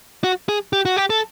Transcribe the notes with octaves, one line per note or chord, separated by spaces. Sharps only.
F#4
G#4
G4
F#4
G4
A4